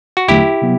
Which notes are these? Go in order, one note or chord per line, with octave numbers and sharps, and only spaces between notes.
F#4
E2 D3 F#3 A3 E4 G4
C3 F#3 B3